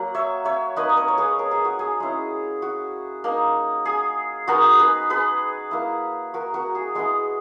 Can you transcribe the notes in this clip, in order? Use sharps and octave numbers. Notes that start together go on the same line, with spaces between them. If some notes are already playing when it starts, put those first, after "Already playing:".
Already playing: F#3 A#3 F#5
C#5 E5
C#5 E5
A#3 D#4 B4 D#5
D#5
A#4 C#5
C#5
G#4 B4
A#4
G#4
F#4
G#4
G#3 C#4 E4
F#4
A#3 D#4
G#4
G#3 B3 D#4 F#4 A#4
G#4 B4
G#4 B4
A#3 E4
F#4 A#4
F#4 A#4
G#4
G#3 B3 E4 G#4